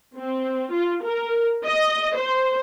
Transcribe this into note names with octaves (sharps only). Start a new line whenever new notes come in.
C4
F4
A#4
D#5
C5